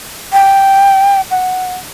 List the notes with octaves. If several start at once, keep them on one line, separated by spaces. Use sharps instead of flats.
G5
F#5